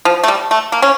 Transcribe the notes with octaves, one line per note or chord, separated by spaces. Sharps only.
F3
A3
G3
A3
A#3
C#4